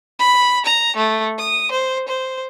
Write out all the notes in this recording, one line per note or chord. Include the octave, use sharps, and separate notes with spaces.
B5
A#5
A3
D#6
C5
C5